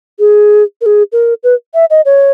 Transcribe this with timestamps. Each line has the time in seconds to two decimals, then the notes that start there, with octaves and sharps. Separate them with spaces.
0.19 G#4
0.81 A#4
0.86 G#4
1.12 A#4
1.43 B4
1.74 E5
1.90 D#5
2.05 C#5